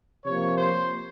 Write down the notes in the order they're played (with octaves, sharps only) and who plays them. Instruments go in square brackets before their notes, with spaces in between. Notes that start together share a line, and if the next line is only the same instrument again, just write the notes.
[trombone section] C3 F3 A#3 [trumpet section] C#5
[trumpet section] C5